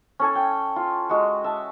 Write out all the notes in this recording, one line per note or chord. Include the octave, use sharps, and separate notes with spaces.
C#4 A4 G#5
G5
F4
G#3 F#4
E5 A5